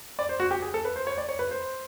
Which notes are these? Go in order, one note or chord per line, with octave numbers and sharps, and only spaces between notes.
D5
C5
F#4
G4
G#4
A4
B4
C5
C#5
D5
C#5
B4
C5